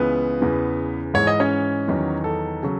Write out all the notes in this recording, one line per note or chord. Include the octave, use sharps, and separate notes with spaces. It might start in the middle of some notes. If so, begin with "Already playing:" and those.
Already playing: C#2 C#3 E3 B3 B4
E2 C#3 E3
G#2 E3 G#3 C#5
D#5
C#4 C#5
E2 D#3 F#3
A4
C#3 F#3